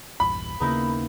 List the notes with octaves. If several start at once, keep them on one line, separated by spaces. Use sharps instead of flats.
A#1 E2 G2 B5
D#2 C#3 A#3 B3 C#4 D#4 E4